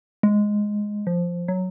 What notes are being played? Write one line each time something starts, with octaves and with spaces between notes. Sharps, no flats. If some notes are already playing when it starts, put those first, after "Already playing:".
G#3
F3
F#3